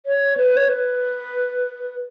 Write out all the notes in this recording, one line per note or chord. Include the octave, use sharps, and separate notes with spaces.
C#5
B4
C#5
B4